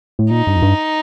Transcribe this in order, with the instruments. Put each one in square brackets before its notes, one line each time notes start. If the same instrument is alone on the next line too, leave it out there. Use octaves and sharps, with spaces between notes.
[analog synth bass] A2
[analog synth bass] A#2 [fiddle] D#4
[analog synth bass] G2
F2
G2